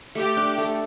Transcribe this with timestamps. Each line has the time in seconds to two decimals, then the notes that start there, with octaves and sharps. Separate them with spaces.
0.15 A3 G4
0.37 D4
0.58 A3